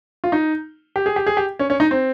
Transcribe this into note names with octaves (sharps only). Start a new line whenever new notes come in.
F4
D#4
G4
G#4
G4
G#4
G4
C#4
C#4
D#4
C4